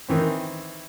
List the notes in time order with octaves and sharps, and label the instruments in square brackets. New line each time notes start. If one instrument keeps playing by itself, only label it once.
[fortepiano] D#3 E3 C4